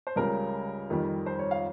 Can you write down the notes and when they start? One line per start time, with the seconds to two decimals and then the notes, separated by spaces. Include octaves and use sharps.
0.07 C5
0.16 C#2 C#3 G3 A#4
0.90 F2 D#3 G3
1.26 C5
1.39 C#5
1.51 F5